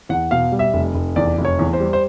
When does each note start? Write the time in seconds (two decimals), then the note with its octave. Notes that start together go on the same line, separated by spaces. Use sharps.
0.09 E2 F#5
0.31 B2 F5
0.52 G3
0.59 E5
0.74 F1
0.95 F1
1.16 E2 D5
1.38 F1
1.45 C#5
1.59 E2
1.73 C5
1.80 G3
1.93 C5